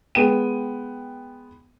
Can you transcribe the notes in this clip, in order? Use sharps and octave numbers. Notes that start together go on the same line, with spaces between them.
G#3 B3 G5 D#7